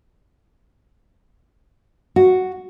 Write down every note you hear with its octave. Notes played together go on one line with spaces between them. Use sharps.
F#4